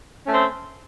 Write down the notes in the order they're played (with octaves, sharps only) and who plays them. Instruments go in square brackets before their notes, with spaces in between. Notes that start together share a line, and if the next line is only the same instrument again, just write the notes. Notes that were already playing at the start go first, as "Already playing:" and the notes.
[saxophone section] C#4
A3
C4